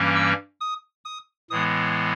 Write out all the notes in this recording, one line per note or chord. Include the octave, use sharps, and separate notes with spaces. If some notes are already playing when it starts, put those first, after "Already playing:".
Already playing: G2 E3 G3 A#3 C#4
E6
D#6
D#6
A2 E3 G#3 B3 D#6